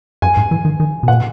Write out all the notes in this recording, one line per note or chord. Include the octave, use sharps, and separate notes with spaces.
F#2 G#5
G#2
E3
D#3
D#3
B2
A#2 F#5